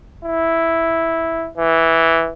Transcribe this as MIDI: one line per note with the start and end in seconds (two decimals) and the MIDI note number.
0.25 1.49 64
1.57 2.32 52